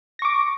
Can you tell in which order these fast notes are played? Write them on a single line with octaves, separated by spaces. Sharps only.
A#6 C#6 D6